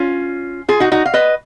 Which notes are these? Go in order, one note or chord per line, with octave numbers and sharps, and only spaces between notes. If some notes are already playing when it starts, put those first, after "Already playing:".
Already playing: C#4 F4
F4 G#4
D#4 F#4
D#4 F#4
F5
B4 D#5